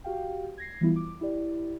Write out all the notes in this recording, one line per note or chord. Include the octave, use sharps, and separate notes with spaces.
F#4 G4 F5 G5
G#6 A#6 C7
E3 G3 B3 E4 F4
D6
E4 G4 D5